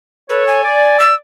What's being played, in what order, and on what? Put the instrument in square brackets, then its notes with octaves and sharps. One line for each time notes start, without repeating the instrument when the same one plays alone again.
[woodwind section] A4 C#5 [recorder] B4
[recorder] G#5
[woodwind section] D5
[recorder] E6